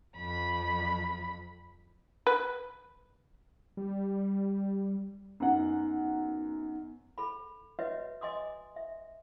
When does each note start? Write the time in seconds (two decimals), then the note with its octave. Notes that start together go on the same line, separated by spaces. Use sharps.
0.16 F2 B5
2.27 B4
3.77 G3
5.40 F#2 B3 D#4 F#5
7.18 A4 B5
7.79 F#4 B4 C#5 D#5 E5
8.21 D#5 G#5 C6 D6 D#6
8.76 E5